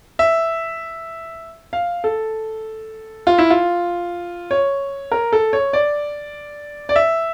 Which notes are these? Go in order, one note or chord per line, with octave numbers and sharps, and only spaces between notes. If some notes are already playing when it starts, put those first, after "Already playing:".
E5
F5
A4
F4
E4
F4
C#5
A#4
A4
C#5
D5
D5
E5